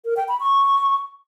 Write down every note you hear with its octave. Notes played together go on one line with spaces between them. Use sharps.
A#4
G5
B5
C#6